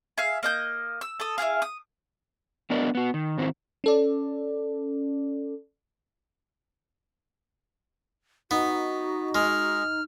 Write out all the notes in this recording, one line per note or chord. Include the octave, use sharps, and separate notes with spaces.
G#4 E5 F5
A#3 D#5 G6
E6
A4 D#6
E4 F#4 G#4 F5
D#6
F#3 B3 D4 A#4 D5 D#5
B3 F#4
D#3
G#2 D#3 C4 E4 C5
C#4 A4 D5
B3 D#4 F#4
G#3 F6